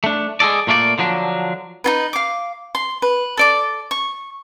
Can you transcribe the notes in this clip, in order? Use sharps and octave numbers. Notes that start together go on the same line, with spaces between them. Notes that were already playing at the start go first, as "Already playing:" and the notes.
A3 D4
G#3 G#4 A4 D5
A#2 A3 A#3 D5
D3 F3 F#3 D4
D#4 F4 B4
F5 D6
C6
B4
A4 D5 D6
C#6